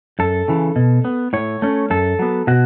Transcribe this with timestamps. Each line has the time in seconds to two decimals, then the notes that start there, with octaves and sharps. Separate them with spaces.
0.19 F#2 A4
0.48 C#3 E3
0.76 B2
1.05 B3
1.33 A2 C#5
1.62 A3 C#4
1.90 F#2 A4
2.19 F#3 B3
2.47 B2 F#4